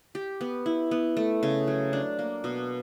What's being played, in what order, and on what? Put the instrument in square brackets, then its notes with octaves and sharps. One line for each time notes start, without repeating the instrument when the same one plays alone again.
[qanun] G4
B3
E4
B3
A3
C#3
F#3
D4
A#3
B2